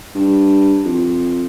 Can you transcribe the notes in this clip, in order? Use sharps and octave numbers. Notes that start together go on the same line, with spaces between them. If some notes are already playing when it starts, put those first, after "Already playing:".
G2
F2